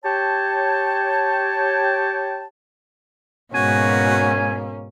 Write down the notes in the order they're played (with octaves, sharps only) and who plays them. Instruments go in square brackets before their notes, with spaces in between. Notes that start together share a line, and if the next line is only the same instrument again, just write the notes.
[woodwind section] G4 C#5 G5 A5
[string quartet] G#2 B2 [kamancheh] A#3 C#4 [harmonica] F#4 [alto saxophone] G#5